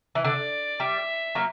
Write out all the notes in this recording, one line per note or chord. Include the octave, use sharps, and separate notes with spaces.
E3
D3 D5
G3 E5
F#3 A#3